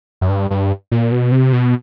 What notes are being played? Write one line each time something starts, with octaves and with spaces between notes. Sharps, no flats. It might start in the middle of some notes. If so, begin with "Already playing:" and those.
F#2
G2
G2
A#2
B2
C3
B2